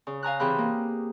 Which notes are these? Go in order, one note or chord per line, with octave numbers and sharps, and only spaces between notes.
C#3
F5 G#5 A#5 F#6
C3 E3 G4 G#4 B5 F#6
A#3